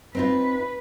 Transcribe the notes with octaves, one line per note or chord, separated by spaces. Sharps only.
C4 D#4 F4 B4